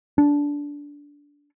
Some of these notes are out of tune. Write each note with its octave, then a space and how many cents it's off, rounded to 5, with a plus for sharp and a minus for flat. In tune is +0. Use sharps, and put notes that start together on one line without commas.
D4 -15